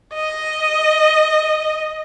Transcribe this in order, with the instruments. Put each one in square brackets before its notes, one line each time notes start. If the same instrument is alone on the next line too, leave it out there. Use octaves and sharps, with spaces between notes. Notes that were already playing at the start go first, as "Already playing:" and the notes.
[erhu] D#5